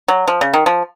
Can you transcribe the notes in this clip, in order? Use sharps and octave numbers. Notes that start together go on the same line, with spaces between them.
F#3
F3
C#3
D#3
F3